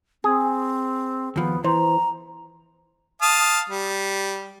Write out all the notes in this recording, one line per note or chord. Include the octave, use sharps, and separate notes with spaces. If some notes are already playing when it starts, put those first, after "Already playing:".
C4 G#4
D#2 F3 B3
E3 C5 A#5
F5 A5 D#6
G3